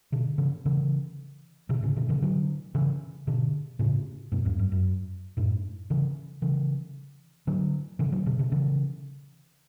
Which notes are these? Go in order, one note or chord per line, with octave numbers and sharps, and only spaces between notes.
B2 D3
C#3 E3
C#3 E3
B2 D3
A2 C#3
B2 D3
C#3 E3
D3 F#3
C#3 E3
B2 D3
A2 C#3
G2 B2
E2 G2
F#2
F#2
F#2 A2
C#3 E3
C#3 E3
D3 F#3
C#3 E3
D3 F#3
B2 D3
B2 D3
C#3 E3